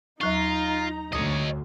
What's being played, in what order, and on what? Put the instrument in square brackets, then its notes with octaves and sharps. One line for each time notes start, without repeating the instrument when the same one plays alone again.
[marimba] D#2 F#3 C#6 [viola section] D#4 A#5 [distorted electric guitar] F4
[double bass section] D2 [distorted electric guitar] C#5 D#5 [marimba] D#6